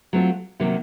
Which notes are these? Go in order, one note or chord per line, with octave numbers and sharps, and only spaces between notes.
F#3 A3 C4 F4
C3 D#3 F#3 A#3